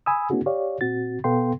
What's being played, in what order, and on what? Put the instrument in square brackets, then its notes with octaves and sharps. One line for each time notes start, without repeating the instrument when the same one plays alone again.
[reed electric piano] G#5 B5 D#6 E6
A#3 C4 D4 E4 F#4 G#4
G4 C#5 D5 F5
A#2 C4 F#4 A6
B2 B3 A4 F5 G5 C6